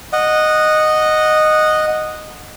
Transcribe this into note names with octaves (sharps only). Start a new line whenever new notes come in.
D#5 F#5